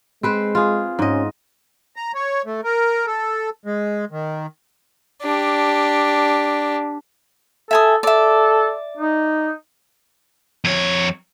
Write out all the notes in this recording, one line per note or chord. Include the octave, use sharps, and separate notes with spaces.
G#3 C4 B4 C5
F4 G#4
G#2 C#4 D#5
A#5
C#5
A3
A#4
A4
G#3
D#3
D4 G4
A4 E5 G#5 D#6
A4 D5 E5
D#4
F2 C#5